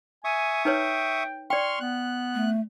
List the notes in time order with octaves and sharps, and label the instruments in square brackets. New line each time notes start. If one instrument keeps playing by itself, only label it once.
[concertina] E5 C#6 D#6 [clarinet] G#5
[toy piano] D#4 B4 C#5 [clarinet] G5
[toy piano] D5 G5 [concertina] C6 C#6 F6
[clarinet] B3 [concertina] F#6
[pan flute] A3